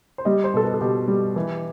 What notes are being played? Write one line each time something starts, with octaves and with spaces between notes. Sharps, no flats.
C5
G3 D#5
C5
B2 A4
B4
A4
B2 G4
G3
E3